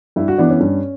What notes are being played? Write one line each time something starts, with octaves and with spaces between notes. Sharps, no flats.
G2 E4
F#4
E3 B3 D4
C#4
G2